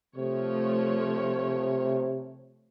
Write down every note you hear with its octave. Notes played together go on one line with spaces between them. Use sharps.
C3 F3 A3 C#5